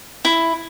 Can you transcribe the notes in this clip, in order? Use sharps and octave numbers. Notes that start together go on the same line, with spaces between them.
E4